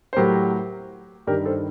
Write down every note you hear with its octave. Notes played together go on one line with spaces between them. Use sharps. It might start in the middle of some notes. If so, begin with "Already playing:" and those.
C5
A2 F#3 G4 A#4
G2 D#3 G3 G4 A#4
A4 C5